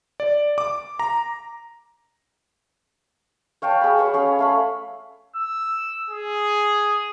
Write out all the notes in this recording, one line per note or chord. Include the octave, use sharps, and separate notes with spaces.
D5
D6
A#5
C#5 F5 G5 A5
G#4 B5
G#4 C#5 F5 F#5
C#4 G#4 F5
A3 F5 B5
E6
G#4